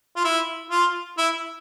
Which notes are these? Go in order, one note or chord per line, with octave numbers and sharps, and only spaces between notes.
F4
E4
F4
E4